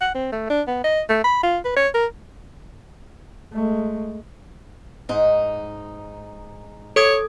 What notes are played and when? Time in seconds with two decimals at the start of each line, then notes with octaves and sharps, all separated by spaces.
0.01 F#5
0.14 C4
0.32 A3
0.50 D4
0.67 B3
0.84 D#5
1.09 A3
1.24 B5
1.43 F4
1.65 B4
1.76 C#5
1.94 A#4
3.53 G#3 A3
5.09 G#2 D#4
6.96 A4 C#5 D#6 G#6